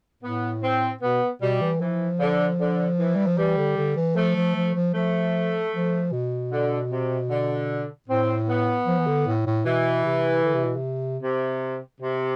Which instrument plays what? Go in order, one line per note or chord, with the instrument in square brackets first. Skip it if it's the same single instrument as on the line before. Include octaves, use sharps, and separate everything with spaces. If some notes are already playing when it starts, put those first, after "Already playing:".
[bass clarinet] A2 [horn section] B3
[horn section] C4
[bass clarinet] B2 [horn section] B3
[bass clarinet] B2 [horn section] G3
[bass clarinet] E3
[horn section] E3 [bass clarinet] F3
[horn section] D3
D3
E3
[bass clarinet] G3
F3
[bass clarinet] E3 [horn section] G3
[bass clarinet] D3
D3
E3
[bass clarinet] F3 [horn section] A3
[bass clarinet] F3
F3
F3
[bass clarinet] F3 [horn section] A3
[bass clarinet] F3
B2
[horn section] D3
C3
D3
[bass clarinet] A2 [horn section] C4
[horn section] B3
[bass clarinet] F3
E3
D3
A2
A2
[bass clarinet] B2 [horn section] E3
[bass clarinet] C3
D3
C3
B2
C3
[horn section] C3
C3